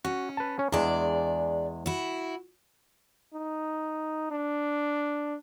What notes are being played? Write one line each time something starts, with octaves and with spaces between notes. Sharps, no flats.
C#4 F#4
B4 A5
C#4
E2 G#3 D4 D5
E4 F#4
D#4
D4